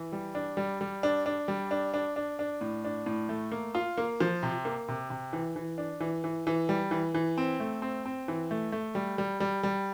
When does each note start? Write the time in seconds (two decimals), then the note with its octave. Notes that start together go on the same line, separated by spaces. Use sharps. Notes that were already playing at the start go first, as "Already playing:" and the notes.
Already playing: E3
0.12 G3
0.35 D4
0.57 G3
0.81 G3
1.03 D4
1.26 D4
1.48 G3
1.71 D4
1.94 D4
2.16 D4
2.39 D4
2.61 A2
2.85 D4
3.06 A2
3.29 A3
3.52 A#3
3.75 F4
3.98 A#3
4.21 F3
4.43 C3
4.65 A#3
4.88 C3
5.10 C3
5.33 E3
5.56 E3
5.78 D4
6.00 E3
6.24 E3
6.47 E3
6.69 G3
6.91 E3
7.14 E3
7.38 C4
7.60 A3
7.82 C4
8.06 C4
8.28 E3
8.51 A3
8.72 A3
8.95 G3
9.18 G3
9.40 G3
9.63 G3